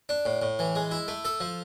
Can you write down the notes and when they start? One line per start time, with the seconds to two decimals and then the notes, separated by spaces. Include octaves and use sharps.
0.09 D4
0.26 A2
0.42 A2
0.59 E3
0.76 G#3
0.91 E4
1.08 A3
1.25 A4
1.40 F3